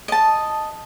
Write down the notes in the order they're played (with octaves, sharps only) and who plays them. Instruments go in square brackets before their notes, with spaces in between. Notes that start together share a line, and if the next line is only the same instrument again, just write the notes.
[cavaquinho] D#5 A5